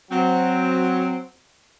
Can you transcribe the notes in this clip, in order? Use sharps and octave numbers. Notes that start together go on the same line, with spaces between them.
F#3 C4